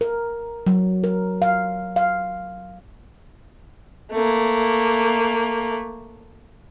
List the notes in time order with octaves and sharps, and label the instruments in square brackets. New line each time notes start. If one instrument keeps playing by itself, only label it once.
[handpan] A#4
F#3
A#4
F5
F5
[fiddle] A3 A#3